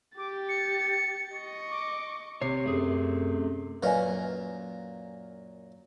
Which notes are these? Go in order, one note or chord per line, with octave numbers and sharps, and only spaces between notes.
G4 D6 A6
C#7
D#5 C#6
D6
C3 C#5 C7
F#2 A3 G#4
F#2 A#2 A#4 B4 D#5 G#5